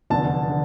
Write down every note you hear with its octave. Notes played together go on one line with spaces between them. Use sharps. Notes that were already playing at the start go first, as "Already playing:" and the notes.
F1 E2 D3 A5
D3